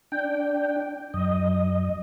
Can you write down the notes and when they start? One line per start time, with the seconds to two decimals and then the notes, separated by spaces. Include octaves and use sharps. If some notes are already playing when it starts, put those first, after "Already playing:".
0.12 D4 G5
1.14 F#2 D#5